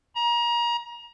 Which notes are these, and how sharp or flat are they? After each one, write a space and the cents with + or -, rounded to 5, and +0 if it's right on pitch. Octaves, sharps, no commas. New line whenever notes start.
A#5 +30